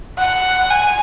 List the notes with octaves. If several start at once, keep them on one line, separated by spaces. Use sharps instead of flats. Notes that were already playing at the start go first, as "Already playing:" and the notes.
F#5
G#5